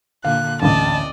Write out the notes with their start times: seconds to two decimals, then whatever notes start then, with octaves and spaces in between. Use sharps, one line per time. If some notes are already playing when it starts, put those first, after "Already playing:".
0.25 A#2 D3 F5 F#6
0.62 A1 D2 D5 D#5 A5